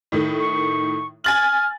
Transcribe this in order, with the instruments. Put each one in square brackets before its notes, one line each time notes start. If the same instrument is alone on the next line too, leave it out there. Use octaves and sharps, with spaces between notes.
[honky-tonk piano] A2 D#3 A3
[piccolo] C#6
[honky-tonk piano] G#5 A6 F#7 [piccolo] F6